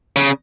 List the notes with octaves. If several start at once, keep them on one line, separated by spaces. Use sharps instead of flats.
C#3